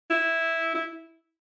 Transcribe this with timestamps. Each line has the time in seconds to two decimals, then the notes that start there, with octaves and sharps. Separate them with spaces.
0.10 E4
0.75 E4